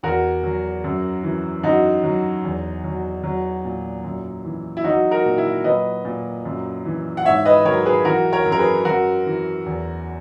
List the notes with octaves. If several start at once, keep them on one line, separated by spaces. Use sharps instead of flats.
E2 F#4 A#4
F#3
F#2
E3
F#2 D#4 F#4
F#3
E2
F#3
F#3
A#2
F#2
E3
E4
F#3 D#4 F#4
F#4 A#4
A#2
E4
F#3 B4 D#5
A#2
F#2
E3
F#5
G#2 C#5 E5
B4 D#5
F#3 A#4 C#5
G#4 B4
E3 F#4 A#4
A#4 C#5
F#2
A#4
G#4 B4
F#2 F#4 A#4
E3
E2